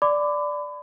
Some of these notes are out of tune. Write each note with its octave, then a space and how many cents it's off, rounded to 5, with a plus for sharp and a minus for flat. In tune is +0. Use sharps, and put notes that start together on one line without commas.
D5 +0 B5 +35 D6 +0